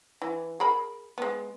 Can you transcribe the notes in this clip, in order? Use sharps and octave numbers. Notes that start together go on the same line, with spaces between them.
E3
G#4 A#4 B5
G#3 B3